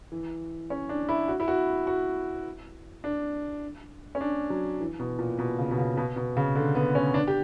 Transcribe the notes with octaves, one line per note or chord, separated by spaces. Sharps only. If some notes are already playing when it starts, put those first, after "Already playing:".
E3
C#4
D4
E4
F#4
E4
F#4
F#4
D4
C#4
D4
F#3
E3
B2
A#2
B2
C#3
B2
C#3
B2
B2
C#3
D3
B3
C#4
D4
G4